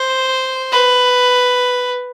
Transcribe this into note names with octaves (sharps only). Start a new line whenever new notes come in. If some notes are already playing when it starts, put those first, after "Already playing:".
Already playing: C5
B4